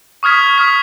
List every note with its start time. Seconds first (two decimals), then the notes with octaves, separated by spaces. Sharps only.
0.23 C#6 D#6 F6 G#6 B6
0.58 D#6 F6 B6